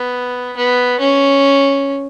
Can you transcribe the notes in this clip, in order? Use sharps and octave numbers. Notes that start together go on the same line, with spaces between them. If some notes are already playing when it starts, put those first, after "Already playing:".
Already playing: B3
B3
C#4